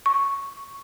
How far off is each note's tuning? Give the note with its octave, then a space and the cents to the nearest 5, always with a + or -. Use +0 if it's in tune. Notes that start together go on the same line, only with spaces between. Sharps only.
C#6 +0